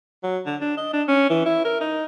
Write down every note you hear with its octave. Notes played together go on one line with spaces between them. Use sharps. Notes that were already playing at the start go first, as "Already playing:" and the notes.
F#3
D3
D4
D#5
D4
C#4
E3
E4
A#4
D#4